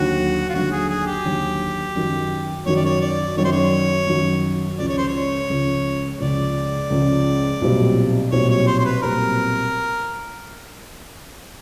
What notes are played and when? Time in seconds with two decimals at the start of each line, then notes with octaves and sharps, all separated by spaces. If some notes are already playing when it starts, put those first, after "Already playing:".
Already playing: D#2 D3 F#3 F#4
0.49 F4
0.54 D#2 D3 F#3 F#4
0.72 G#4
0.89 G#4
1.07 G4
1.25 D#2 D3 F#3
1.96 F#2 D#3 F#3
2.66 F#2 D#3 F#3 C#5
2.76 D5
2.85 C#5
3.01 D5
3.37 F#2 D#3 F#3 C#5
3.45 C5
3.52 C#5
4.07 F#2 D#3 F#3
4.78 C#2 C#3 F3 D5
4.88 C#5
4.98 C5
5.08 C#5
5.49 C#2 C#3 F3
6.19 C#2 C#3 F3 D5
6.90 C#2 C#3 F3
7.61 B1 A#2 G3 C4
8.32 B1 A#2 G3 C4 C#5
8.50 C#5
8.67 C5
8.80 C5
8.85 B4
9.02 B1 A#2 G3 C4 A#4